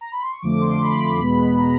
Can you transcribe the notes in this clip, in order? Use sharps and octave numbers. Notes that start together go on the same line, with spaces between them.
A#5
B5
C6
C#6
F2 D3 F3 A3 D6
C6
B5
E2 B2 G#3 B3
A#5